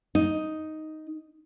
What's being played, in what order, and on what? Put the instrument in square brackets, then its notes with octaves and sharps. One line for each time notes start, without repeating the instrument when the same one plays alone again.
[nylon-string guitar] D#4